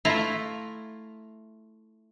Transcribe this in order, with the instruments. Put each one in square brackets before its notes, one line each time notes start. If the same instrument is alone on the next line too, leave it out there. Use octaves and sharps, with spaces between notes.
[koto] A3 E4 F4 A#5